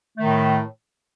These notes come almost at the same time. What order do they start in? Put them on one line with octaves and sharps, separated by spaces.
A3 D#3 A2